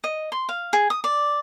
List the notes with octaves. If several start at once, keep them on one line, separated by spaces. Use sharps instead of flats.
D#5
C6
F5
G#4
D#6
D5